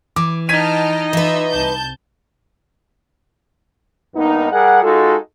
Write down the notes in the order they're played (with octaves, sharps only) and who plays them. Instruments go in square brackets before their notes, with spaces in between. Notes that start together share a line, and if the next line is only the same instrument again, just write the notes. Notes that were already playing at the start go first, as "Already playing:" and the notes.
[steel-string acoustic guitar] E3 [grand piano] D6
[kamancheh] D#4 D#5 [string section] G5 A5 F6 [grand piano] G#6 B6 D#7
[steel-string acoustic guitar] E3 B4 [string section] F4 E5
[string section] C2 A5 G6
[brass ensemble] G2 A#3 B3 D#4
G3 G#4 A#4 F#5
G#3 D#4 F4 F#4 A4